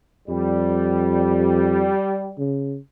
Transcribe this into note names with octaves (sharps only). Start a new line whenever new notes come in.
F2 G3
C#3